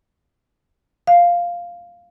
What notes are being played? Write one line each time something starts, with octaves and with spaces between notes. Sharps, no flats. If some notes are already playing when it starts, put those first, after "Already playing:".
F5